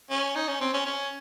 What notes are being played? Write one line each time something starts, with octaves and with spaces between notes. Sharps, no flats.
C#4
D#4
C#4
C4
C#4
C#4